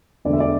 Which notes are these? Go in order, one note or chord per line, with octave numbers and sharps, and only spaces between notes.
E1 D2 D3 D5
E5
D5